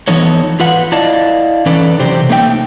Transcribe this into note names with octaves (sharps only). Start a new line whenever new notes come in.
E3 F3 B3 D#4 A4 C#5
F4 B4 F#5
E4 D5 D#5 F5 A5
E3 C#4 D#4 A4 B4 D5
C3 F#3 G4 C5
A3 A#3 D#4 D#5 G5